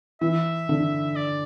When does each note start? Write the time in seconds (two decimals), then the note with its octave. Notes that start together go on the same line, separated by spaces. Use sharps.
0.21 E3 E5
0.69 D3
1.16 D5